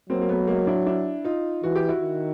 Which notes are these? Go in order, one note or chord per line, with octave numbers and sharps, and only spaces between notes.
F#3 A#3 C4
A#3
A3 B3
G#3 A#3
D4 E4
D4 E4
D#4 F4
E3 F#4
G4
E4 F#4
D#3